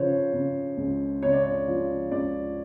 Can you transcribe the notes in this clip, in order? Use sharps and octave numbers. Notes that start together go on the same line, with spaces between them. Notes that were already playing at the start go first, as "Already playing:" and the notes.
Already playing: C#3 F3 C5 C#5
C#3
C#2
C#3 C#5
D5
C#5
F3
C#2 D5